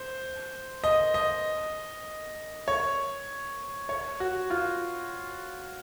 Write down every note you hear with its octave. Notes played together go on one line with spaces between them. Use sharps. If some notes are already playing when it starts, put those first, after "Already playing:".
Already playing: C5
D#5
D#5
C#5
C#5
F#4
F4